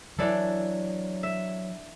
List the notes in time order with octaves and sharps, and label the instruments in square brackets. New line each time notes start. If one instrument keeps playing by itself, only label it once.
[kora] E3 D4 A4 [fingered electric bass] F#3
[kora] E5